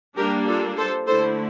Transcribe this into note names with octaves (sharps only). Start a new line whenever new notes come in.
G3 A#3 D4 G4 A#4
F4 A4
A4 C5
D3 A3 E4 A4 C5